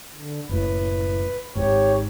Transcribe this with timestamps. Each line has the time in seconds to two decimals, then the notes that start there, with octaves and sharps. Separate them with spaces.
0.16 D3
0.49 F#1 A2 B4
1.55 G#1 G#2 G4 C#5